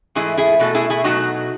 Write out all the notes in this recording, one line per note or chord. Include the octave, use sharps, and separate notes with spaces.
G#2 E3 A3 E4 G#4
E4 G#4
B2 A3 F#4 A4
E4 G#4
E4 G#4
B2 F#3 A3 D#4 F#4